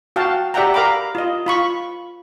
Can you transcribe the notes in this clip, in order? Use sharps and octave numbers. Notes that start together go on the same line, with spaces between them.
F#4 F5 G5 A5
G4 D5 E5 F#5 G5 A#5
A#4 F5 A#5 B5 D6
F4 D#5
F4 B5 C#6